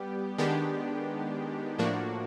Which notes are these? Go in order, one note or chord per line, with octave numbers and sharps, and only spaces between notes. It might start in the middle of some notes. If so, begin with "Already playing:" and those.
Already playing: G3 B3 G4
D#3 G#3 B3 D4 G4
A2 F3 A#3 D4 F#4